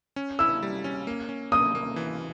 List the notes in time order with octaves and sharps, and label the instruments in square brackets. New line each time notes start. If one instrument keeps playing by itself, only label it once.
[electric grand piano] C#4
[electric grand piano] E4 [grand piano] E6
[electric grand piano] G3
C#4
A#3
C#4
[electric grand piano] A#3 [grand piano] D#6
[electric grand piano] A#3
E3